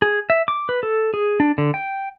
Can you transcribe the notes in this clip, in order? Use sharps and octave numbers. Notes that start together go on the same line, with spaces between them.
G#4
E5
D6
B4
A4
G#4
D4
D3
G5